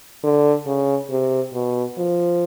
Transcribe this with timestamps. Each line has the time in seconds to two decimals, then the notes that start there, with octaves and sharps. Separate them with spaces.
0.24 D3
0.66 C#3
1.10 C3
1.54 B2
1.98 F3